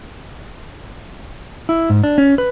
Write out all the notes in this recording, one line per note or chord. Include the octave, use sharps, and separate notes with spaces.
E4
G#2
D4
C#4
B4